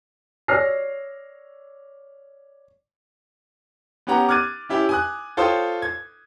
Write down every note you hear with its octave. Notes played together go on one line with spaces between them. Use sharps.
C#5 D5 E6 F6 A#6 C7
B3 C#4 G4 F#5 A#5
D6 F6 F#6 G#6 A6 D#7
C#4 E4 G4
G#5 D#6 F#6
F4 A4 C5 C#5 G5 D#6
G#6